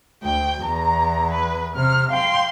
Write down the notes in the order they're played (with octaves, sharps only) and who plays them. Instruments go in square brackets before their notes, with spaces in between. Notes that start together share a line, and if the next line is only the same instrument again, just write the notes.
[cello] D2 [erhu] G5
[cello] E2 [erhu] A#5
[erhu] B4
[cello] C3 [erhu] F6
[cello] F5 G5 [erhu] C6